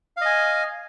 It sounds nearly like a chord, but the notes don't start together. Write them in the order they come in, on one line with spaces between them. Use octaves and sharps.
F5 D#5 G#5